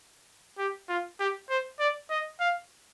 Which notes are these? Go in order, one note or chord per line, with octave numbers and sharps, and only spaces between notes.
G4
F4
G4
C5
D5
D#5
F5